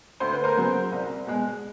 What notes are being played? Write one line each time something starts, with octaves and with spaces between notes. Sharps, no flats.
D2 C5
B4
A#4 C5
C#3 F#3 B3
C2
B2 G#3